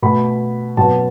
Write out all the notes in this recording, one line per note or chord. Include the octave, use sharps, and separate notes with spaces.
B2 A3 B5
B2 F#3 B3 A5